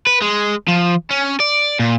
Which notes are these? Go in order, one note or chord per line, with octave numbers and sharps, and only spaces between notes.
B4
G#3
F3
C#4
D5
A#2